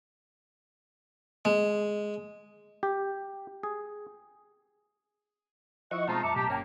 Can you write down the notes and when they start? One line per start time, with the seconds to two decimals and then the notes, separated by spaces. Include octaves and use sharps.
1.45 G#3
2.83 G4
3.63 G#4
5.91 F3 E4 D#5 F#5 C#6 E6
6.08 B2 G#3 A3 C4 D#4 F4 A5 A#5
6.23 F#2 E5 C#6 D6
6.36 B1 A2 G4
6.48 G1 A#3 C#4 G5